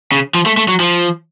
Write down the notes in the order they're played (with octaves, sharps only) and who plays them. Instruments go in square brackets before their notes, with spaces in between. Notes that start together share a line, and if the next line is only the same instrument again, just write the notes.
[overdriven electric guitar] C#3
F3
A3
A3
F#3
F3